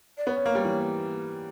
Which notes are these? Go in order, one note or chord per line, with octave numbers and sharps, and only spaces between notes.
D5
B3 C#5
C#4
A#3
G3
E3